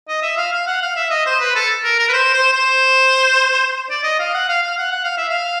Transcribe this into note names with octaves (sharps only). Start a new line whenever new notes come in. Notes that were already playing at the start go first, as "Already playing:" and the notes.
D#5
E5
F5
F5
F#5
F5
E5
D#5
C5
B4
A4
A#4
A#4
B4
C5
C5
C5
D5
D#5
F5
F#5
F5
F5
F#5
F#5
F5
E5
F5